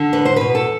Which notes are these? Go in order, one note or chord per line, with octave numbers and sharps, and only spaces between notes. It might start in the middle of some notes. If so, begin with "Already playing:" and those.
Already playing: D3
E2 B4
C5
B2 B4
A4